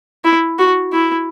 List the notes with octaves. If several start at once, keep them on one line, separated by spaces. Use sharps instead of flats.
E4
F#4
E4